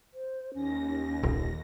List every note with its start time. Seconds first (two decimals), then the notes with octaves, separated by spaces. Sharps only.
0.14 C5
0.54 D#2 C#4 A#6
1.23 D#1 C2